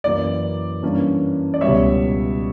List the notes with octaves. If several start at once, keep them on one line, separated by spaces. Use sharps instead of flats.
F#2 E3 A#3 D5
G2 E3 A#3 C#4
D5
C#2 B2 G3 C#4 C#5 E5